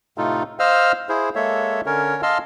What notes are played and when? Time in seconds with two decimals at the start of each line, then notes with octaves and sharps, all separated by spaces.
0.18 A2 C3 A3 D#4 F4 A4
0.59 C5 D#5 F5 E6 F6
1.09 E4 G#4 C5
1.35 G#3 A#3 A4 C#5 E5
1.86 D3 C#4 A#4 C#5
2.23 D#5 F5 A5 C6 E6 F6